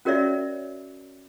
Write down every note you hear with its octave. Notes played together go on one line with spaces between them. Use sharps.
C#4 F#4 A#4 C#5 D5 E5